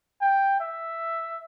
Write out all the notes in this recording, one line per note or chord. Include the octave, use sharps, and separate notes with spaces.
G5
E5